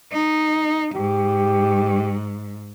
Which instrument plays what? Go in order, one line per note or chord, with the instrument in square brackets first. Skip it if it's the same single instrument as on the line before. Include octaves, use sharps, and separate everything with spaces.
[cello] D#4
[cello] G#2 [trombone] G4